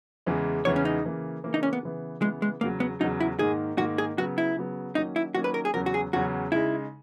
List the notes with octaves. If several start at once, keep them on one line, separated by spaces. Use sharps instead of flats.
E2 C#3 E3 G#3
E2 C#3 E3 G#3 C#5
C#4
D#4
C#3 E3 A#3
C#3 E3 A#3
D#4
C#4
B3
C#3 E3 B3
C#3 E3 G#3 B3
G#3
E2 C#3 F#3 A#3
B3
E2 C#3 F#3 D#4
E4
G#2 D#3 A#3 G#4
G#2 D#3 A#3 F#4
G#4
C#3 F#3 B3 F#4
E4
C#3 F#3 B3
D#3 F#3 A#3 C#4 D#4
E4
D#3 F#3 A#3 C#4 F#4
B4
A#4
G#4
E2 C#3 F#3 C#4 A#4
F#4
G#4
E2 C#3 F#3 C#4 F#4
C#3 G#3 D#4 E4